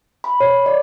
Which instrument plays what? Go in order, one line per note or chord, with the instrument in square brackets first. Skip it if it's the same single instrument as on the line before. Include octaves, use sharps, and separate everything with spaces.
[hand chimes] B5
C#5
D5